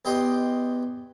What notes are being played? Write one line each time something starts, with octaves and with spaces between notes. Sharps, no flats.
E2 G4 D#5 G5 C6